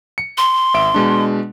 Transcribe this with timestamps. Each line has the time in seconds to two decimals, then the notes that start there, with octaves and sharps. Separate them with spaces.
0.18 C#7
0.38 C6
0.74 G#1 E5 D7
0.94 B2 G#3 D4